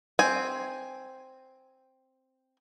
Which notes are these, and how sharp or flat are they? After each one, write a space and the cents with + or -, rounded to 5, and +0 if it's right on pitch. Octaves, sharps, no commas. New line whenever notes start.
C4 +0 G#5 +0